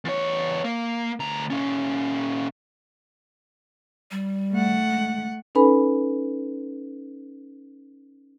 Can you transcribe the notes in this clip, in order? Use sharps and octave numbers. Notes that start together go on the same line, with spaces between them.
E2 C#5
A#3
D2 A#5
A#2 C#4
G3
A3 F#5
G#3
C#4 D#4 A4 B4 G#5 B5